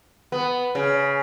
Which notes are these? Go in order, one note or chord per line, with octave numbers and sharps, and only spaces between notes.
B3
C#3